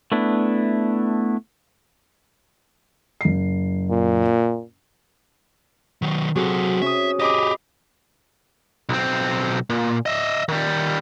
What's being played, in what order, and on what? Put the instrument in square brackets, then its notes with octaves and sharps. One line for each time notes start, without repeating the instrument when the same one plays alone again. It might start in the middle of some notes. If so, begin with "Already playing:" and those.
[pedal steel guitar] A3 B3 D4 E4
[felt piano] F#1 C7
[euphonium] A#2
[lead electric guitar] D#3 F#3
[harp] C3 F#4 G#4 [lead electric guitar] F#3 A4
[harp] C#4 D#6 [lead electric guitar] E5
[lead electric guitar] G4 G#4 [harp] D#5 B5 D6
[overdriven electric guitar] B1 C4
A#2
D#5 E5
D#3 G3